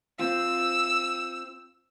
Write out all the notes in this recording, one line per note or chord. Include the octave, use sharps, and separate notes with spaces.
C4 F4 E6